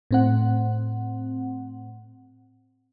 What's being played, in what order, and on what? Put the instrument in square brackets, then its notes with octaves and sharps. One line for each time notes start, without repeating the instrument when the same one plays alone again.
[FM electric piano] A2 C4 F#5